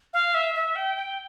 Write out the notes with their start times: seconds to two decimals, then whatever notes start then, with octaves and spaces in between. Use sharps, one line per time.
0.13 F5
0.34 E5
0.54 E5
0.76 G5
0.96 G5